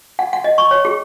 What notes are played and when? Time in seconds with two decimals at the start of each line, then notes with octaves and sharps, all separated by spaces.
0.19 F#5
0.33 F#5
0.44 D#5
0.58 C#6
0.71 C#5
0.85 G#4